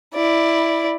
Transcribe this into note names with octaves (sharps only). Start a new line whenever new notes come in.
E4 D5